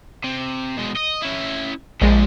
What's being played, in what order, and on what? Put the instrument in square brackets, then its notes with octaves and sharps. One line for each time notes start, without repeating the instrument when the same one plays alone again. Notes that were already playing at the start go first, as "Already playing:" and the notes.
[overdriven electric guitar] C3
B2 G#3
D#5
C#4 E4
[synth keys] A#1 G#3 [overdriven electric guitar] F3 D4